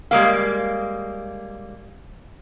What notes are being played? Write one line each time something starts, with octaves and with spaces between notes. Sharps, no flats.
G3 G#3 A#3 F5